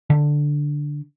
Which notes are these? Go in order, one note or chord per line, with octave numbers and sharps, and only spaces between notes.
D3